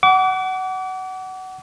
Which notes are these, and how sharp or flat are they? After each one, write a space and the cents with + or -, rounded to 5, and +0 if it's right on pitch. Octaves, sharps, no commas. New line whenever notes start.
F#5 +20 D6 -35